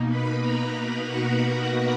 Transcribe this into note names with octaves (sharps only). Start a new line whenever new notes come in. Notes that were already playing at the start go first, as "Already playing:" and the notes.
Already playing: B2 A#3 D#4
B4 B5
A#4 A#5
F#4 F#5